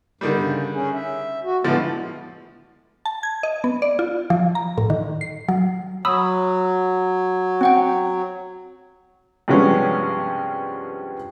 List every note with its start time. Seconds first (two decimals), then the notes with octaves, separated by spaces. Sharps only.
0.21 G2 D3 D#3 G3
0.36 C#3
0.74 C#4 G#4
0.93 E5
1.43 F#4
1.64 A2 D3 F3 G#3 B3 E4
3.05 A5
3.23 G#6
3.43 D#5
3.64 B3
3.82 D5
3.99 F4
4.30 F3
4.55 A#5
4.78 A2
4.90 D#3
5.21 C7
5.48 F#3
6.05 F#3 B5 D#6 E6
7.61 C4 F#5 G5
9.48 G2 C3 F3 G#3 B3 C#4